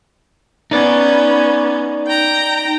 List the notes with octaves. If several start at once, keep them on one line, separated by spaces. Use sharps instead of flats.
B3 C#4 D#4 D5
G5 A#5